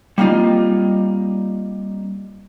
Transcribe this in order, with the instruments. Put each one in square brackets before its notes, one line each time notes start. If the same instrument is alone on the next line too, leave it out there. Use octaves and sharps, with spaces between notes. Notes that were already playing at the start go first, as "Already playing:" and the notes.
[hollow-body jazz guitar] G3 A#3 C4 D#4 F4